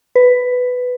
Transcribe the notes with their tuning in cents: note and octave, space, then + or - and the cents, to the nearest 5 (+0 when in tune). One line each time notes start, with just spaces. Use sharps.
B4 +10